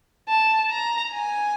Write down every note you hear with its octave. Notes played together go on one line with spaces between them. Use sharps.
A5
A#5
G#5